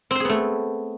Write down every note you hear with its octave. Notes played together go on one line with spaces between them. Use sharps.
A3 B3 C4 G#4 C5